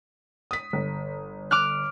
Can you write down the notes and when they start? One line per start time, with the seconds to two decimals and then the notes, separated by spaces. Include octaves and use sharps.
0.51 D#6 B6
0.73 G1
1.51 D6 F6 F#6